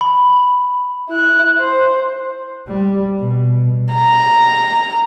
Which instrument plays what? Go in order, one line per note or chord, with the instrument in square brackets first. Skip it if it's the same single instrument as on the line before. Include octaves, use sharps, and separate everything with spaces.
[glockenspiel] B5
[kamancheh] E4 F#6
C5
[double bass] G3
B2
[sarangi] A#5